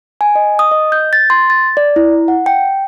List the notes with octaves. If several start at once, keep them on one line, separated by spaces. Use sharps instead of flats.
G#5
D#5
D#6
D#5
G6
A6
C6
A6
D5
E4
F#5
G5